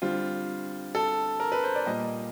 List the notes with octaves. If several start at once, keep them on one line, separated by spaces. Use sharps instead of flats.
D3 G3 C4 F4
A4
A#4
B4
C5
D5
A#2 G3 A#3 D#5